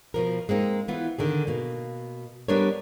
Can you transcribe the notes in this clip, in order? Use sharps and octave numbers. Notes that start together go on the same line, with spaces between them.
B2 F3 A#4
G#3 A#3 C4 D#4
E3 B3 F4
D3 D#3 G#4
B2 A#3
G3 B3 D4 A#4 C#5